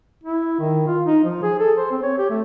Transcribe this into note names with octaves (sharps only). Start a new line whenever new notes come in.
E4
D#3
F4
D#4
F3
G#4
A4
C5
C4
C#5
G4
A3